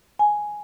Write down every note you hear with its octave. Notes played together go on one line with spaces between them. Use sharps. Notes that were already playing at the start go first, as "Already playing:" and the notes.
G#5